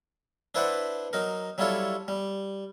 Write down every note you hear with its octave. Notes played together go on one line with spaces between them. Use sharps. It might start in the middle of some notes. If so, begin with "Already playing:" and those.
D4 E4 B4 C5 D5 F#5
F#3 D#4 A#4
F#3 G3 E4 F4 A4 C#5
G3